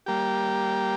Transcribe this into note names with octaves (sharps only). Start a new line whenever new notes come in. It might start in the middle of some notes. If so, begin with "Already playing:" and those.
G3 A#3 G4